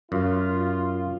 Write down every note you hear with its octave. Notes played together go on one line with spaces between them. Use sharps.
F#2 F4